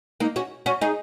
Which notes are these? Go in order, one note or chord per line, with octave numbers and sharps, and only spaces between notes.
A#3 D#4
C#4 F#4
C#4 F#4
D#4 G#4